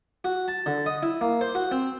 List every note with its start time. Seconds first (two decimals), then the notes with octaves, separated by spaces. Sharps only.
0.24 F#4
0.48 A5
0.66 D3
0.86 D#5
1.03 E4
1.21 A#3
1.41 C5
1.55 F#4
1.71 C4